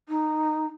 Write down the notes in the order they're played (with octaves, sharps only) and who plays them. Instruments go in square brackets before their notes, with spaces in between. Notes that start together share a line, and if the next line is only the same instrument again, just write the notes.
[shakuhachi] D#4